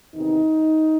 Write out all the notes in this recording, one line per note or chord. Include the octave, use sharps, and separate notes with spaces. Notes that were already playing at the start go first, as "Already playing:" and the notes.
E2 C3 D#3 D#4